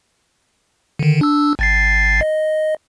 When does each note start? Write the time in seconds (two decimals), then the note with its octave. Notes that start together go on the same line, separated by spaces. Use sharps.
0.99 D3 D#3
1.21 D4 E6
1.59 G#1 A6 C7
2.21 D#5